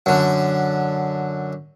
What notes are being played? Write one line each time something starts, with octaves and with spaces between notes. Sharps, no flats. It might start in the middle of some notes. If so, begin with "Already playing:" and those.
F#2 D3